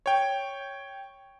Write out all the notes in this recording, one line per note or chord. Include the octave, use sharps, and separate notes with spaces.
C#5 G5